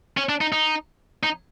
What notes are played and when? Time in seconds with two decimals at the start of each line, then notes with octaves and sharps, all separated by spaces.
0.17 C#4
0.29 D4
0.41 D#4
0.52 D#4
1.23 D#4